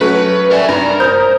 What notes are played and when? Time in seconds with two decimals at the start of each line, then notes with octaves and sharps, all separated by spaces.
0.01 F#3 A3 C#4 B4
0.50 G3 A#4 E5 G#5
0.69 G2 A#4
1.00 C5 A#5 D#6 G6